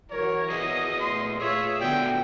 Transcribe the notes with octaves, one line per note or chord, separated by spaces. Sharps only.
E3 F#4 A#4 C#5
F#4 G#4 B4 D#5 E5
A#2 A3 C6
F4 G#4 C#5 E5
D3 B3 F4 F#4 A4 D5 G5